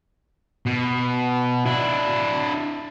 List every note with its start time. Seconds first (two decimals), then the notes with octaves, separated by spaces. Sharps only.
0.66 B2
1.66 D4 E4